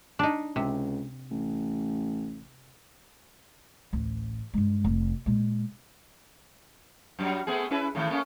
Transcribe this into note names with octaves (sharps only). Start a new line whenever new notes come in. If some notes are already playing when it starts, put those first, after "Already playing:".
D4 D#4
C#2 C3
A1
A1 D2
G2 G#3
F1
A#2 G#3
F#2 F#3 G3
A3 B3 G#4
C#4 E4 B4
A2 D#3 A3
A3 A#3 C#4